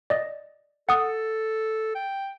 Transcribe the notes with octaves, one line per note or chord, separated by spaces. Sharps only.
D5 D#5
A4 F#5 D#6
G5